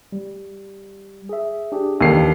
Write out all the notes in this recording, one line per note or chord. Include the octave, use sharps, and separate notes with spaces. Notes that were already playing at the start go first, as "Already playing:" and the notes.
G3
G#4 E5
D4 G4 G#4
D#2 E3 D4 A4 C7